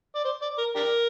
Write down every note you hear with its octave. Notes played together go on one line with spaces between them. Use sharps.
D5
C5
D5
A#4
D4 G4 A#4